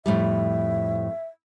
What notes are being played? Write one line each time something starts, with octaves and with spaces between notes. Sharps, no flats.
F2 A2 G3 E5